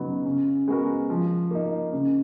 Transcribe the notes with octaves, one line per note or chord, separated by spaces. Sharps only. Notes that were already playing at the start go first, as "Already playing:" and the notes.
Already playing: C#3 F#3 B3 D#4
C#3
G#3 B3 F#4 A#4
F3
A#3 D#4
C#3